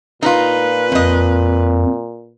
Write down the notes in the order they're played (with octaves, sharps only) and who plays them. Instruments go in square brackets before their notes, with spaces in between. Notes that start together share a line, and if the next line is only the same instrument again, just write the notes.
[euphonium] A#2 [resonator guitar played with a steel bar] D#4 F4 [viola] B4
[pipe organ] F2 [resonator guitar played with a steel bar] F3 D#5